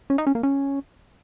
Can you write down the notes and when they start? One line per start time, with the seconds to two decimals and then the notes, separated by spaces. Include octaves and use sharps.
0.10 C#4
0.18 D#4
0.27 C#4
0.35 A#3
0.43 C#4